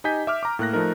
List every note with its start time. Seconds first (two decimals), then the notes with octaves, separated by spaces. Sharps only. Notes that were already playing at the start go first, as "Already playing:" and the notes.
0.04 D#4 G4 D#5 G#5 G6 B6
0.27 E5 D6 F6
0.43 A#5 D6
0.59 A2 A#3 F#6 A#6
0.73 F3 A3 D#4 A#4